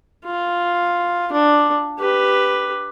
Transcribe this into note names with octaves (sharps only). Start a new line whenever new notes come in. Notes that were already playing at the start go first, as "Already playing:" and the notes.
F4
D4
G4 B4